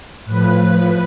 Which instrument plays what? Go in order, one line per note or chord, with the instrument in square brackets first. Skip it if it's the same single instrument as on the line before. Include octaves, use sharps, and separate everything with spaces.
[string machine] A2 F3 B4